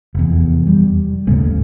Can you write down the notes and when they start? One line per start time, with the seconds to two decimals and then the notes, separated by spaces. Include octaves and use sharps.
0.15 F1 E2
0.67 G3
1.27 D#2 G#2 C#3 A3